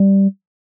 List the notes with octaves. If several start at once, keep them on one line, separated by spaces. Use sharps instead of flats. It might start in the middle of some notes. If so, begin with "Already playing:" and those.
Already playing: G3